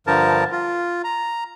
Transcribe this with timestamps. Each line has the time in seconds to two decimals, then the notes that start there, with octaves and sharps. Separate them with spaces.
0.07 G2 D3 F3 A#4 A5
0.51 F4
1.04 A#5